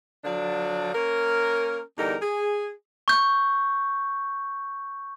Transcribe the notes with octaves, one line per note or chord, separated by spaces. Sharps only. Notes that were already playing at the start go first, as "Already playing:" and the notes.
D3 F3 F#3 D4
A#3 C#4 A#4
E2 D3 G3 D#4 A#4
G#4
C#6 G6